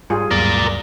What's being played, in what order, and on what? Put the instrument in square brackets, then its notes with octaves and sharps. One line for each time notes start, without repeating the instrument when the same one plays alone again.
[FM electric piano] G#2 [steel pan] G3 F4 G#4
[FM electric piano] D2 G2 F#3 [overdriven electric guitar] A#4 D5